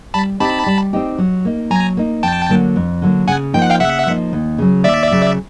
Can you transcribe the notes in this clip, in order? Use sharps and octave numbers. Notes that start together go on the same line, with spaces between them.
G3 A5 B5
C4 D#4 G4 A5 B5
G3
C4 D#4 G4
F#3
A#3 D#4
F#3 G#5 A#5
A#3 D#4
F2 G5 A5
D3 F#3 A#3
F2
D3 F#3 A#3
C#3 F#5 G#5
F3 A#3 D#4 G5
F#5
F5 G5
C#3 E5 F#5
F3 A#3 D#4
D#2
C#3 F#3
D#2 D5 E5
C#3 F#3